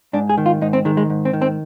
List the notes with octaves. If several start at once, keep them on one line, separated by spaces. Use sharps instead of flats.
G#2 D4
G#4
D#3
F4
G#2 D#4
C4
D#3 G#3
G#3
G#2
C4
D#3
C4